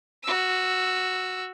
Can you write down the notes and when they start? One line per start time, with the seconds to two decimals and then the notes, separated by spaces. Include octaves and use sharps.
0.23 F#4 E6